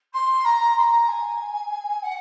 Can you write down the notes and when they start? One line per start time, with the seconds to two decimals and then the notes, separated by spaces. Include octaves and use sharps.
0.13 C6
0.44 A#5
0.76 C6
0.81 A#5
1.08 G#5
2.02 F#5